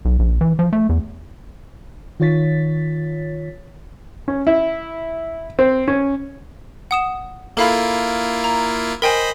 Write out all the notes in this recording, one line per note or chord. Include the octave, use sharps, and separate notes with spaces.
B1
A#1
E3
F3
A3
E2
D#3 F4 C#5 A6 B6
C#4
E4
C4
C#4
F#5 D#6 E7
A#3 E4 F4 A4 F5 B5
A#5
A#4 C5 D#5 G5 G#5 B5